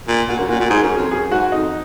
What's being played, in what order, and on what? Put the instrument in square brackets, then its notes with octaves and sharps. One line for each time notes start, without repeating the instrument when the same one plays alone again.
[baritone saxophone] A#2
[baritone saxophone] A#2 [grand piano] F#4
[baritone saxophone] F#2
[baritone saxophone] A#2 [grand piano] F#4
[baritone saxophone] A#2
[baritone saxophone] G#2 [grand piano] G#4
[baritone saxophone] F#2
F2
[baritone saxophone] F#2 [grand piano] G#4
[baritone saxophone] G#2 [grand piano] F#4
[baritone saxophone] F2 [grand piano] D#4